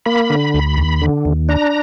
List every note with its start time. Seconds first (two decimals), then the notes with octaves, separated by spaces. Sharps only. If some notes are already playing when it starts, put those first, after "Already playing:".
0.06 A#3 B5
0.30 D3
0.54 D2
0.77 D#2
1.01 D3
1.25 D#2
1.49 D4 A#5